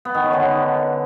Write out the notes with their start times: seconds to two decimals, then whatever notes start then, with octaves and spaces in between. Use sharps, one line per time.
0.05 B3
0.15 D#3
0.24 C#4
0.33 D3
0.42 D4